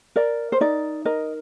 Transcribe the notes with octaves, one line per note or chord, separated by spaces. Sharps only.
A#4 D5
C5
D#4 D5
A#4 D#5